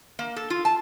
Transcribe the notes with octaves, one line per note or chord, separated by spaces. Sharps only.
A#3
A4
F4
A5